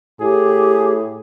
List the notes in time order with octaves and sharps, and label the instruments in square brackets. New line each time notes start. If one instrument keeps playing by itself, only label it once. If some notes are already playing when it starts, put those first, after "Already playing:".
[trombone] A2 [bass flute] G4 [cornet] G#4